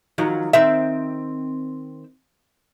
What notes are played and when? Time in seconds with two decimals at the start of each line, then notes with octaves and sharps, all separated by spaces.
0.18 D#3 F3 F#3
0.53 D#3 C4 E5